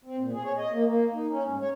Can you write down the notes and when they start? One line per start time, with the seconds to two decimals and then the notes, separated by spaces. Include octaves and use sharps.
0.05 C4
0.19 A#2
0.32 G#4
0.44 C#5
0.57 D#5
0.72 A#3
0.85 A#3
1.14 D#4
1.30 C#4
1.46 G#2
1.61 C#5